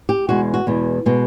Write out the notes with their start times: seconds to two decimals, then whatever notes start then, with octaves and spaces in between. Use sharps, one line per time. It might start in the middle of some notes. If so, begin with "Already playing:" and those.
0.09 G4
0.28 E2 B2 G#3 F#4
0.54 F#4
0.67 E2 B2 G#3
1.06 B2 G#3 B3